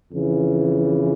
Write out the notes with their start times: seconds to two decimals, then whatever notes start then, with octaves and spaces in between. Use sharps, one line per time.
0.12 F2 C#3 E3